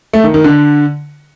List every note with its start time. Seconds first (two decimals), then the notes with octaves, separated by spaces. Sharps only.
0.13 A3
0.24 D#3
0.34 D#3
0.44 D3